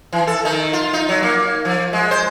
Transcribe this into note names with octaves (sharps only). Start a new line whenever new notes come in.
E3
A4
D#3
F4
D#4
F#3
A#3
F3
G#3
C5